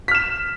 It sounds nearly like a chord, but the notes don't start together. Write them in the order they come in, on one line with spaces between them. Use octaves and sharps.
B6 F6 E7